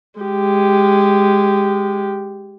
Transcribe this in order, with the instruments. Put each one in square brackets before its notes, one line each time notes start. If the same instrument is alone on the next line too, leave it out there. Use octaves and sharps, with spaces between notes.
[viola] G#3 G4